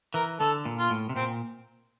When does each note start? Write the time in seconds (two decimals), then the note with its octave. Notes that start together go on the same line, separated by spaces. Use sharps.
0.14 E3 A#4
0.40 D3 A4
0.65 A#2
0.78 F4
0.90 A2
1.09 C3
1.16 A#2 C4